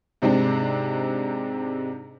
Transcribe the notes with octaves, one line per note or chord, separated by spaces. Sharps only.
G#2 C3 G#3 C4 D4